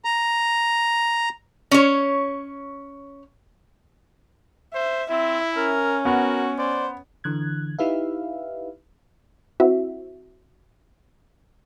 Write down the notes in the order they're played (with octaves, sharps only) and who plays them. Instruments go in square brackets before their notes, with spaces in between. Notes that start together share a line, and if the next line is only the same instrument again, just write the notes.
[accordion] A#5
[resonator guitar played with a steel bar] C#4 C#5
[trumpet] C5 [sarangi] E5
[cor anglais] C4 [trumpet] E4 [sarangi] E5
[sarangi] C#4 [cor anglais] A#4
[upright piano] B3 [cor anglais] F#4 [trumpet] A#4
[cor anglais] C5 [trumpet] D5
[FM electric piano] D3 E3 F#6 G#6
D#4 E4 G4 B4 E5 F5
[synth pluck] C4 E4 F#4 E5